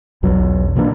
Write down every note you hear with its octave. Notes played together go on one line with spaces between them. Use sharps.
B1 E2 B2 F#3
B2 E3 A#3 D4